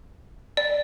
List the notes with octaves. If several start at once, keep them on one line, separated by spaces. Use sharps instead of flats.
D5